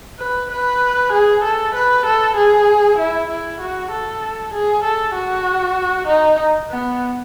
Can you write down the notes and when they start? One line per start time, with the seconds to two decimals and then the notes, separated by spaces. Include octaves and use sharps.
0.19 B4
0.51 B4
1.12 G#4
1.44 A4
1.75 B4
2.06 A4
2.36 G#4
2.98 E4
3.30 E4
3.61 F#4
3.92 A4
4.54 G#4
4.84 A4
5.15 F#4
6.08 D#4
6.70 B3